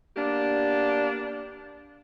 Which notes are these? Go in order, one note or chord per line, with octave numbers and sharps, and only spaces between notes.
A#3 B3 D4 G4